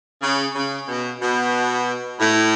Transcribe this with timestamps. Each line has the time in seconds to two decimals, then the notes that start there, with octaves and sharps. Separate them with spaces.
0.22 C#3
0.55 C#3
0.88 B2
1.21 B2
2.19 A2